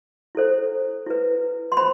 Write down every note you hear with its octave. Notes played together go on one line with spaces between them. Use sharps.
E4 A4 C5
E4 B4
C6
C5 B5